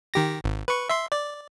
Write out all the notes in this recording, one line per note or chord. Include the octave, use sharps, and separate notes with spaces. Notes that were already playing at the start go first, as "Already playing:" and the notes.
D#3 G4 A#6
G#1
B4 C#6
E5 C6
D5